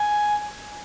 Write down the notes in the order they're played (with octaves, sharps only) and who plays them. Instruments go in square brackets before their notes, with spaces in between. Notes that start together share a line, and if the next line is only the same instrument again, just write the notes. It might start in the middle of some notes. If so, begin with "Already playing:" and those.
Already playing: [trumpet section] G#5